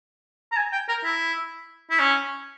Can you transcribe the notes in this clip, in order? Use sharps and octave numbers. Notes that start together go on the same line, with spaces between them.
A#5
G#5
G5
A#4
E4
E4
C#4